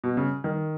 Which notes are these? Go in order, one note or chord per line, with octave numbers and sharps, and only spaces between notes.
B2
C#3
D#3